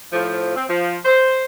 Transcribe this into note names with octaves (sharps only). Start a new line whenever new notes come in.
A2 F3
C4
F3
C5